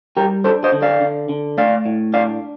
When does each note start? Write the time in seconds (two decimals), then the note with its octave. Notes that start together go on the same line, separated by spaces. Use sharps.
0.17 G3 G4 A#4
0.44 D4 A4 C5
0.64 C5 D#5
0.73 D3
0.82 D5 F5
1.01 D3
1.29 D3
1.58 A3 D5 F5
1.86 A2
2.14 D4 D5 F5